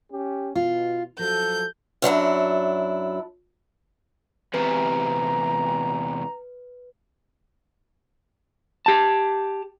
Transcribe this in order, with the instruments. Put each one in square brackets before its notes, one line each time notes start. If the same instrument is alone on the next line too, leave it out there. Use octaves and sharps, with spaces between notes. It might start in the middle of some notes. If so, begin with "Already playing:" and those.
[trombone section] C#4 G4
[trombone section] B2 [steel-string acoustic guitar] F4
[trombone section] F3 A4 [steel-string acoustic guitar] F#3 [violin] G6
[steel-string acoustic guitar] F#2 F#3 D4 E4
[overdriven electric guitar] E2 C3 [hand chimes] B4 [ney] A#5
[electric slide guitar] G4 A5